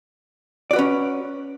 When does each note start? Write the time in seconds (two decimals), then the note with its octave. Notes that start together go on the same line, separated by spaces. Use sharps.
0.71 D5
0.73 F#4
0.76 B4
0.79 C#4